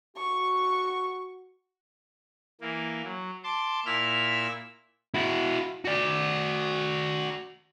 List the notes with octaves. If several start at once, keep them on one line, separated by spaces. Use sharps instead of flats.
F#4 C#6
E3 A#3
F#3
A5 C6 D6
A#2 E4 E5 E6 F6
E4 F#4
F#4 D5